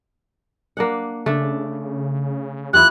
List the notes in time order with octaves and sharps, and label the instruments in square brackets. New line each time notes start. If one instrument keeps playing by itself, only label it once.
[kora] A#3 D4 F#5
[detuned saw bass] C#3 [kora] A3 D4
[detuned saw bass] E2 [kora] E4 F4 G4 [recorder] F#6